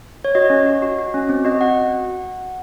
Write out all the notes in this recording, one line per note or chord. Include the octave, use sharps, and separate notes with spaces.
C#5
F#4 D#5
C#4
F#4
F#4
F#4
C#4
C4
F#4 D#5
F#4 F#5